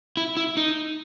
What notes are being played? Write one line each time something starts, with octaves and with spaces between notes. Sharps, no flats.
E4
E4
D#4